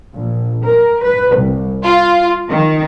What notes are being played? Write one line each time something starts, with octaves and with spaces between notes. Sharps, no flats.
A#1
A#4
B4
C2
F4
D#3